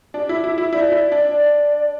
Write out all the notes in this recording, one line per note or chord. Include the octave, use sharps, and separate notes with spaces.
D4 G4
E4
E4
E4
E4 D5
E4
D4
D5